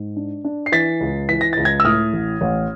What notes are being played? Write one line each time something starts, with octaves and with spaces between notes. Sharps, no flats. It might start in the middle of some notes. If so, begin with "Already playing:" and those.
Already playing: G#2
D4
D4
C7
E3 A6 B6
C#2
E3 B6
A#6
C#2 A6
G#6 A#6
E6
A2 D#6 F6
A1
A1